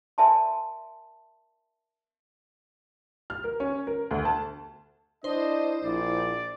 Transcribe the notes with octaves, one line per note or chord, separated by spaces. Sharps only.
A#4 D5 E5 G#5 A5 C6
F6
A#4
C#4
A#4
D2
A5
D4 E4 C5 D#5
A#1 D5